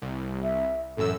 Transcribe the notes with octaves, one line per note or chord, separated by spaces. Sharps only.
C2
E5
A1 F#2 A4 E6